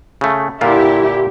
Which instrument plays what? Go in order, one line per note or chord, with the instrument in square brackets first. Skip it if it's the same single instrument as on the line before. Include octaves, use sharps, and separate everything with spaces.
[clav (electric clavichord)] C#3 A3
[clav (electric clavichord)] A#2 D3 F4 [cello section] E4 G4